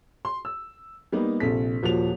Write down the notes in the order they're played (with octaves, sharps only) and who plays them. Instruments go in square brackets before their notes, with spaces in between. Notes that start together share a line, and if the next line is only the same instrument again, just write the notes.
[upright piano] C6
E6
G3 A#3 B3 D#4
A#1 C3 A4 B6
D#1 F3 A#3 F#4 F7